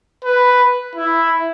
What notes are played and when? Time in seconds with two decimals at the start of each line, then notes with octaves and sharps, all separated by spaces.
0.24 B4
0.95 E4